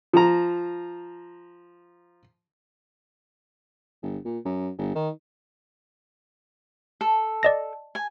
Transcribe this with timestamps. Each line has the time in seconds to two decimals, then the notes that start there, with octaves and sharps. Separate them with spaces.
0.13 F3 A#5
4.03 G1
4.25 A#2
4.45 F#2
4.78 G1
4.95 D#3
7.01 A4
7.43 D5 D#5 A#6
7.95 G#5